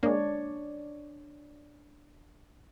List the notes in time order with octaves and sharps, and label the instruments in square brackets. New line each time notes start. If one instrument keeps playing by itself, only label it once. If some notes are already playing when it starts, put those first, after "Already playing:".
[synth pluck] G#3 A#3 [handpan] D4 C#5 D5